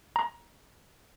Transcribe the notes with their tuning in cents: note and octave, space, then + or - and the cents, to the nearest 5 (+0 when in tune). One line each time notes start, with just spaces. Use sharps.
A#5 +20